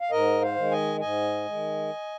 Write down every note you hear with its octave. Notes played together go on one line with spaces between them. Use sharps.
F5
G#2 A#4 D#5
C5 F5
D#3 G#3
D#5 G#5
G#2 D#5 G#5
D#3 G#3